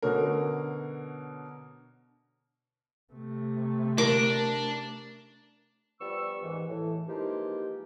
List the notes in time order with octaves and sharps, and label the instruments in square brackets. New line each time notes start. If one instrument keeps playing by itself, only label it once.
[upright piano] B2 D3 C#4 A#4
[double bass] C3 A3
[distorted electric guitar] D4 [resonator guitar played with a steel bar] A#4 [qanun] D6
[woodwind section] F3 G3 B3 D5 C#6 E6
D#2 G#2 E3
A2 E3
E3 F3 G#3 A#3 D#4 G4